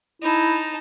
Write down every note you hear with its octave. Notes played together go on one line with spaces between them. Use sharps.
D#4 E4 A5